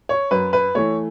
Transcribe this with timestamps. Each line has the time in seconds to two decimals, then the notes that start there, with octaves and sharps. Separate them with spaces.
0.09 C#5
0.31 F#2 B4
0.53 B4
0.75 E3 A3 C#5